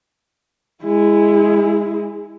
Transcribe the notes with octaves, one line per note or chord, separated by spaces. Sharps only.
G#3 E4